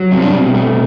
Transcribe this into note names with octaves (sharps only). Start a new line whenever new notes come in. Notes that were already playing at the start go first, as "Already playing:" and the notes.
Already playing: F#3
G3 C4
D4
B2 C4
A3